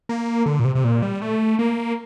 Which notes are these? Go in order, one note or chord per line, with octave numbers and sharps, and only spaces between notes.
A#3
D3
A#2
C3
C3
A#2
G3
A3
A#3